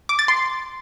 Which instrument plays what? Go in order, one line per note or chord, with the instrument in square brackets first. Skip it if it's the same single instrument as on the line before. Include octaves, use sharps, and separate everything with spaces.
[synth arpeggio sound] D6
A6
C6